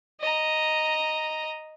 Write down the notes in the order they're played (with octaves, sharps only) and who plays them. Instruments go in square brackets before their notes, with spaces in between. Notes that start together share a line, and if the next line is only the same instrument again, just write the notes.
[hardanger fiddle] D#5 A#5